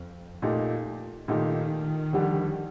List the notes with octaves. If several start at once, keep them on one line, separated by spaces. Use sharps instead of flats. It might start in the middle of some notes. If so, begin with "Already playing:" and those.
Already playing: F2
A#2 A3 D#4 G4
A#2 D#3 A3 D#4 G4
F2 D3 G3 D4 G4